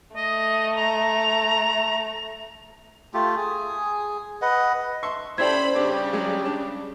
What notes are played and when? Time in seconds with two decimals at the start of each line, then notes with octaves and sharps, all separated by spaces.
0.16 A3 D#5
0.77 A#5
3.14 A3 F4 G4
3.36 G#4
4.42 B4 D#5 F#5
5.03 E5 C6 C#6
5.38 C#4 E4 G4 A4 C5 D5 B5 G#6
5.75 C#3 G3 C4 D4 G4
6.13 F#3 G#3
6.45 D4